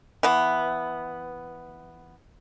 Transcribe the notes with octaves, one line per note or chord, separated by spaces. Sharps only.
E3 B3